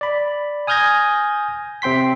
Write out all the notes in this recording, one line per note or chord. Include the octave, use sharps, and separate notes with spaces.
D5 B5
G#5 D#6 F6 G6 G#6 A#6
C3 C4 G5 C6 B6